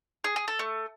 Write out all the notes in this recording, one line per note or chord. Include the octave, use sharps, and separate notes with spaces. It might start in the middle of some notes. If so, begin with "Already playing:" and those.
G#4
G#4
A4
A3